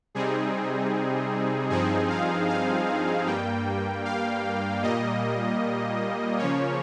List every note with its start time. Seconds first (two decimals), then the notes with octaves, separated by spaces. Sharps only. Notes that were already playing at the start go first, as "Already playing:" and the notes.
0.15 C3 G3 C4 D#4 G#4
1.70 G2 F3 C4 D#4 G#4
2.09 F5
2.49 F5
3.26 G2 G3 A#3 G5
4.05 F5
4.83 A#2 G3 A#3 D#5
6.38 C#3 F3 A#3 C#4 C#5